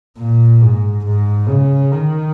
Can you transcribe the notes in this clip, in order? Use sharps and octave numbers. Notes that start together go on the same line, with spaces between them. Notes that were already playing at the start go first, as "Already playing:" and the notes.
A#2
G#2
G#2
C#3
D#3